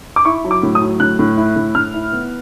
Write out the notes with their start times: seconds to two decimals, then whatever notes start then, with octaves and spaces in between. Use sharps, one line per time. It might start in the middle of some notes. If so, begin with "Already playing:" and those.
0.16 D6
0.25 E4 C#6
0.44 F#3
0.51 D6
0.63 A2
0.75 D#6
0.81 F#3
1.00 A2 F#6
1.19 A2
1.37 E4
1.56 A2
1.75 A2 F6
1.94 E4
2.12 B3